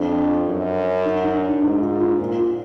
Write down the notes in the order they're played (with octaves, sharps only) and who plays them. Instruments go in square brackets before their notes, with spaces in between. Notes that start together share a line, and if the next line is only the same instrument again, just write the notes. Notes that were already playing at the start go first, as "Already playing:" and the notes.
Already playing: [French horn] F2 [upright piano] D4
[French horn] F#2
[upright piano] D#4
D#4
D4
D#4
[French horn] G#2 [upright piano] D#4
[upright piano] F4
F4
[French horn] A#2 [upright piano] F4
[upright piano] F4